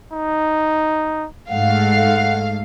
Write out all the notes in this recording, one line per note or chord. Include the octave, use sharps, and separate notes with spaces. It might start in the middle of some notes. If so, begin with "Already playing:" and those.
D#4
G#2 A3 F5 F#5